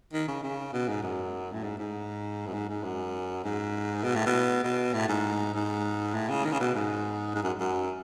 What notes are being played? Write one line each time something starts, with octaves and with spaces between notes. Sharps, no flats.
D#3
C#3
C#3
B2
G#2
F#2
A2
G#2
G#2
F#2
G#2
G#2
F#2
G#2
B2
A2
B2
B2
A2
G#2
G#2
A2
C#3
D#3
C#3
B2
G#2
G#2
F#2
F#2